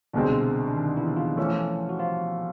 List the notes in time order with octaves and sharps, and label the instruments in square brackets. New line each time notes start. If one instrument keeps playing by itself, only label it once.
[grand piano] C2 B2 G#3 C4 [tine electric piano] D3 D4
[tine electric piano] D4
D#3 D#4
E3 E4
F3 F4
[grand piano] E3 A3 C#4 [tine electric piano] F3 F4
[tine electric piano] F#4
F3 F4